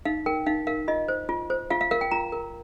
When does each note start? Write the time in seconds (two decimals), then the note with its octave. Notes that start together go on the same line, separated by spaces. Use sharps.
0.05 D#4 F5
0.26 A#4 G5
0.46 D#4 F5
0.67 A#4 F5
0.88 F4 D#5
1.08 C5
1.29 F4
1.50 C5
1.70 F4 F5
1.81 F5
1.91 A#4 F5
2.01 G5
2.11 F4 A#5
2.32 A#4